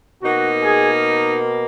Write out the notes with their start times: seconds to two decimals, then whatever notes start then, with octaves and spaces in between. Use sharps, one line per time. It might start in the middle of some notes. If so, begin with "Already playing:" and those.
0.22 B2 A#3 D#4 F#4
0.63 G#4